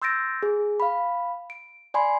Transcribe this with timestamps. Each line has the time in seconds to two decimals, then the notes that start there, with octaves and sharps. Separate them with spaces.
0.02 C6 E6 G6 A6 A#6 D7
0.43 G#4
0.80 F5 B5
1.50 D7
1.94 D5 G#5 B5 C6